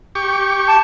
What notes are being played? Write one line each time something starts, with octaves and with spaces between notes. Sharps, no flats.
G4 C#6
A5